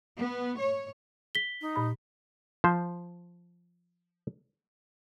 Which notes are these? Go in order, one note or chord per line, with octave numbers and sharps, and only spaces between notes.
B3
C#5
B6 G7
D#4
A#2 B5
F3 C5